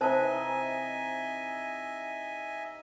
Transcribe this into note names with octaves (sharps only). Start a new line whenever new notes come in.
C3 E3 D#4 C5 D#5 E5 G#5 A5